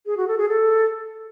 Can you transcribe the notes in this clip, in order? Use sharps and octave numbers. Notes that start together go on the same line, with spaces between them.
G#4
F#4
A4
G#4
A4